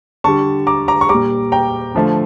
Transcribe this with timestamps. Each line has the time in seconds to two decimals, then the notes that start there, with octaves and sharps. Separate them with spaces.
0.24 D3 G3 A5 C#6
0.67 A#5 D6
0.88 A#5 D6
1.01 C#6
1.09 A#2 G3 A#5 D6
1.52 G5 A#5
1.95 D3 F3 A3